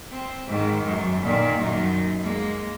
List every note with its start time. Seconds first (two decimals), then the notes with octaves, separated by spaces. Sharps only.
0.11 C4
0.47 G#2 D#3
0.83 F#2
1.22 A#2 D#3
1.59 F#2 D#4
2.23 G#3 A#3